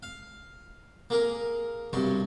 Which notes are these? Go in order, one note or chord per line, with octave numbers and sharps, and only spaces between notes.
F5
A#3 G#4 A#4
B1 G2 C3 C#6